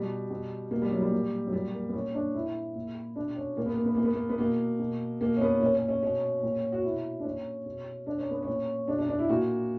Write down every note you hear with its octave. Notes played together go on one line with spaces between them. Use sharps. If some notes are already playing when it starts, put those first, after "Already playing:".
Already playing: B2 G3
B2
B2 A#3
G3
F#3
G3
A#2
F#3
A#2 G3
A#3
B3
A#2 C#4
D4
A#2 E4
A#2
B2 D4
C#4
A#2 A#3
B3
A#3
B3
A#2 A#3
B3
A#3
B3
B2 A#3
B2
B2 A#3
C#4
B3
A#2 C#4
C#4
C#4
B2 C#4
A#2
F#4
B2 E4
D4
A#2 C#4
B2
B2 D4
C#4
B3
C#4
A#2
B2 D4
D4
D4
E4
A#2 F#4